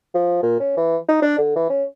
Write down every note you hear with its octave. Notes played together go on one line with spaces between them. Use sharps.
F3
A#2
C#4
E3
D#4
D4
D3
E3
C#4